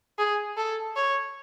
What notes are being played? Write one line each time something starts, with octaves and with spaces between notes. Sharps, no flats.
G#4
A4
C#5